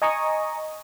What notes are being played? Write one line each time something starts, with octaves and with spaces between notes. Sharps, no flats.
D#5 G#5 A#5 C#6 D#6